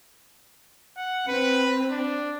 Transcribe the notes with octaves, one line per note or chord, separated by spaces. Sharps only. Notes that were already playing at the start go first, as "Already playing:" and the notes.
F#5
C4 B4
D4